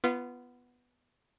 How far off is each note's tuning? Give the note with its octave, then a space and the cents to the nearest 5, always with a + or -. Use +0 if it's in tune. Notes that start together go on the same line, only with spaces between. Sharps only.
B3 +0 F4 -25 B4 +5